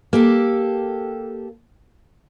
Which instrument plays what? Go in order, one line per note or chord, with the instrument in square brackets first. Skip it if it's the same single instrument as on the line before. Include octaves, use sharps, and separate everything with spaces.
[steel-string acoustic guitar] A#3 G4 A4